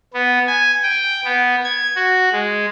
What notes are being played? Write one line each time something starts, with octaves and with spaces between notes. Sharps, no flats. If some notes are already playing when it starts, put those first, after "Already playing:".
B3
G#5
G5
B3
G#6
F#4
G#3